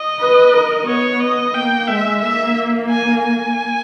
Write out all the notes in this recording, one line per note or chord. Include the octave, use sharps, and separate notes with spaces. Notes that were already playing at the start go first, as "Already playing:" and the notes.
Already playing: D#5
B4
A#4
B3 C#5
D#5
A#3 G5
G#3 E5
A#3 E5
G#5
G#5